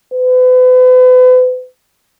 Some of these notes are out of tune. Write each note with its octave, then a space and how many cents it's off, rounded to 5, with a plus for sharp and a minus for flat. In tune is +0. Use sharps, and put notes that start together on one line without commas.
B4 +40